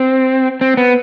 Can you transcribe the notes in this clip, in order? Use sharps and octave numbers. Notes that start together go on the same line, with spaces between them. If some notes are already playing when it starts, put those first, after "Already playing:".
Already playing: C4
C4
B3